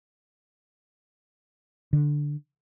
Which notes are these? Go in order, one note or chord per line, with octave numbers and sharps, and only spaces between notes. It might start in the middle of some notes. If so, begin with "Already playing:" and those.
D3